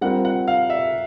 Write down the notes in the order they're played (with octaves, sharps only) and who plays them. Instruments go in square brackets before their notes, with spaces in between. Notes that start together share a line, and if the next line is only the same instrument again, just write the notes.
[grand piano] G3 C4 F4 A#4 [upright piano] F#5
[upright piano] F#5
F5
E5